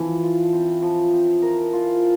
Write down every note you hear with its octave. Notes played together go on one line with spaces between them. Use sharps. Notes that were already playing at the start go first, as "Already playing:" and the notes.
Already playing: E3 F3
F4
C4
F3
C4
A#4
F4